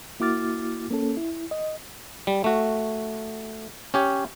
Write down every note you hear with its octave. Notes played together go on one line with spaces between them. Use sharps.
A#3 E4 F#4 D6 F6 A6
A#3 C#4 A4
E4
D#5
G3
A3 F#4
C#4 G4 C#5